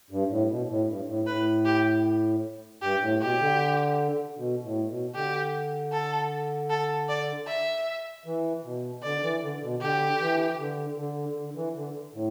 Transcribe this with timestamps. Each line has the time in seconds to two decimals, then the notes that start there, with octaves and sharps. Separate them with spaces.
0.10 G2
0.30 A2
0.49 B2
0.69 A2
0.87 G2
1.07 A2
1.27 A2 B4
1.65 G4
2.82 G2 G4
3.01 A2
3.21 B2 G4
3.40 D3
4.38 B2
4.63 A2
4.89 B2
5.15 D3 G4
5.93 A4
6.70 A4
7.09 D5
7.47 E5
8.26 E3
8.64 B2
9.03 D3 D5
9.23 E3
9.43 D3
9.62 B2
9.81 D3 G4
10.20 E3
10.59 D3
10.98 D3
11.37 D3
11.55 E3
11.76 D3
12.14 A2